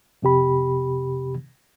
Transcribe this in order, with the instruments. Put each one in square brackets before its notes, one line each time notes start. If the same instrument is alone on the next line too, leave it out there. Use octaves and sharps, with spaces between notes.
[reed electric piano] F2 C3 G4 B5